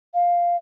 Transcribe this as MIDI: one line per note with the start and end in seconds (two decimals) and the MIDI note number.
0.14 0.56 77